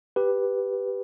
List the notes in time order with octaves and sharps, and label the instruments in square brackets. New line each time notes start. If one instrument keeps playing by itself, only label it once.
[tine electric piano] G4 B4